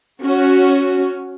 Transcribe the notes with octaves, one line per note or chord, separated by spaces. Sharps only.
C#4 F#4